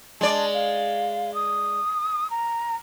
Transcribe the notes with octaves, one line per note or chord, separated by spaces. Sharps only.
G#3 D5 A5
F5
D#6
A#5